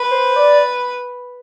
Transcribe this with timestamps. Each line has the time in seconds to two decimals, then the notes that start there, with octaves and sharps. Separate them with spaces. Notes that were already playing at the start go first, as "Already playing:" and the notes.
Already playing: B4
0.11 C5
0.36 D5